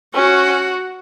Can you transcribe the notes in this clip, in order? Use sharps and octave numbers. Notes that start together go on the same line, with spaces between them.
C#4 F#4